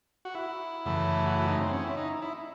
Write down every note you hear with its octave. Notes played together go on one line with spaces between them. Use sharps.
F#4
E4
F#2 C#3 E3 A3
F#4
E4
D#4
C4
C#4
E4
D#4
E4